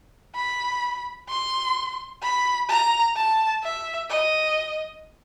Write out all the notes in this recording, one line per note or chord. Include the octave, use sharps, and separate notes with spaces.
B5
C6
B5
A#5
A5
E5
D#5